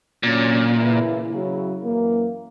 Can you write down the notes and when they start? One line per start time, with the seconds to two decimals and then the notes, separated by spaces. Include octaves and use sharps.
0.23 A#2 D3 F#3 C#4
0.77 C#3 E3 A#3 E4
1.30 C#3 F#3 C#4 E4
1.84 F#2 E3 A#3